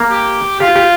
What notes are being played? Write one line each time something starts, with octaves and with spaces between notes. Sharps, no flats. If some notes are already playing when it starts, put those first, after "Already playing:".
Already playing: A#3
G4
F4 G4
G4